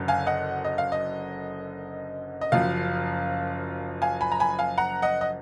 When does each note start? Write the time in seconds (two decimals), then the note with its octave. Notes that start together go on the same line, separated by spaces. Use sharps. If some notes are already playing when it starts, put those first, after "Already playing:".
Already playing: F#1 F#2 D3
0.08 F5 G#5
0.27 D#5 F#5
0.65 D#5
0.78 F5
0.92 D#5
2.41 D#5
2.52 F#1 F#2 F3 F5
4.02 F5 G#5
4.21 G#5 B5
4.32 A#5
4.40 G#5 B5
4.59 F5 G#5
4.78 F#5 A#5
5.02 D#5 F#5
5.21 D#5